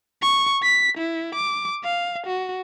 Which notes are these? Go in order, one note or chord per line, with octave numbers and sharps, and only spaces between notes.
C#6
B6
E4
D6
F5
F#4